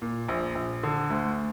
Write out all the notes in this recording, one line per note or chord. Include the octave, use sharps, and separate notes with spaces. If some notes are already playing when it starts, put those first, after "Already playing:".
A#2
A#1
A#1
D3
D2